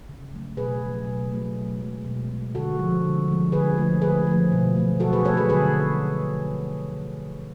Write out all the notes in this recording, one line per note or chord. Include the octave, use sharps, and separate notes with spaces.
C#3
F#3 A3
B2 G#4 B4
F#3 A3
B2
F#3 A3
B2
G#3
B2
G#3
D3 F#4 A4
F3 G#3
D3
F3 G#3
D3 G#4 B4
F3 A3
D3 G#4 B4
F3 A3
B2
F#3 A3
B2 F#4 A4
G#4 B4
F#3 A3 A4 C#5
G#4 B4
D3 G#4 B4